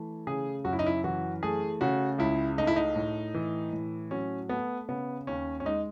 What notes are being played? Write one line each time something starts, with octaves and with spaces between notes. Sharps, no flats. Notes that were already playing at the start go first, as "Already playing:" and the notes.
Already playing: E3 A3
C#3 G#4
F#2 F#4
E4
D#4
E4
E3 F#4
A3 G#4
C#3 F#4
C#2 E4
A3 D#4
E4
D#4
A2
E3
A2
F#3 C#4
A3 B3
C#3 B3
D#2 C#4
C#4
G#3 D#4